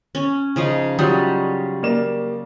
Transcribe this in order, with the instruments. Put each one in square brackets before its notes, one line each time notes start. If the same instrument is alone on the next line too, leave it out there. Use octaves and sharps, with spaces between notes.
[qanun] C#4
C#3 F3 D#4
[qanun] F#3 [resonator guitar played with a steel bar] G3 [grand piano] F4 D#6
[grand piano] A#3 D5 E7